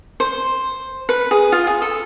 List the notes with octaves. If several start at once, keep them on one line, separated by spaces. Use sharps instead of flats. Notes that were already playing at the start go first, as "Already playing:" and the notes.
C5
B4
G#4
F4
G#4
A4